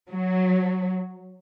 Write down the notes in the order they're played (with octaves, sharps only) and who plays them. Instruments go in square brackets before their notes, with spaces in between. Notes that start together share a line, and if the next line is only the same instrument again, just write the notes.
[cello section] F#3